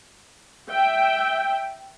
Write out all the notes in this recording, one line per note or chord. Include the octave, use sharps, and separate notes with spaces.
E5 G5